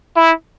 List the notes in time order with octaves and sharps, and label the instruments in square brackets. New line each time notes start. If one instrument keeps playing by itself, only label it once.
[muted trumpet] E4